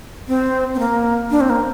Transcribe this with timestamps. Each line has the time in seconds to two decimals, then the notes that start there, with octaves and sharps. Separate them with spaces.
0.28 C4
0.74 C4
0.79 A#3
1.31 D4
1.41 C4
1.50 A#3